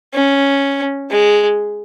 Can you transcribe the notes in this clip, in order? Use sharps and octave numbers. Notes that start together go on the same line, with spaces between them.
C#4
G#3